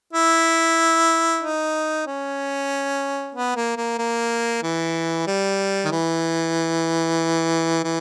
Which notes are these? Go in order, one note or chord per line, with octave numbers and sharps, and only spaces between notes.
E4
D#4
C#4
B3
A#3
A#3
A#3
E3
G3
D#3
E3
E3